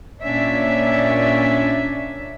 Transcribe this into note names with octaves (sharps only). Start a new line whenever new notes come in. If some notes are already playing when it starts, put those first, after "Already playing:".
A#2 C#4 D4 E5